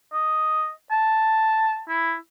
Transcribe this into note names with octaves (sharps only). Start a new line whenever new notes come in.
D#5
A5
E4